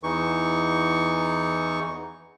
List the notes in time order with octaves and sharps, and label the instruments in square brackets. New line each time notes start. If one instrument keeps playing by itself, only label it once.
[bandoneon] E2 E3 D#4 C#6